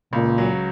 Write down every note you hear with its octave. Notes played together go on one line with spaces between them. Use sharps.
C#2 A#2
F#3